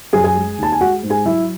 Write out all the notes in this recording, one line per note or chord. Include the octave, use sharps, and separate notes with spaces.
F#2 G#4 G#5
G#4 G#5
G#3
D#2 A5
G#5
G#3 F#4 F#5
G#2
G#4 G#5
F#3 E4 E5